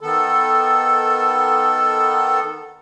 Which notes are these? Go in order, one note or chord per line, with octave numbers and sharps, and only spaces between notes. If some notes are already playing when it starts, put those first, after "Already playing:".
D#3 B3 A4